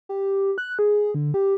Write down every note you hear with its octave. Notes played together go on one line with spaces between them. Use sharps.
G4
F#6
G#4
D3
G4